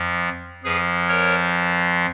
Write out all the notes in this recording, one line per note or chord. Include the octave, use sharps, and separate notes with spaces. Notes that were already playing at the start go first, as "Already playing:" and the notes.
Already playing: F2 F3
F2 F3 G#4 B4
A#4 C#5